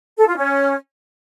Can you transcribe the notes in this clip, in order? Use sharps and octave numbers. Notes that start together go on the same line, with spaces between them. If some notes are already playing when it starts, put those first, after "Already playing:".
A4
F4
C#4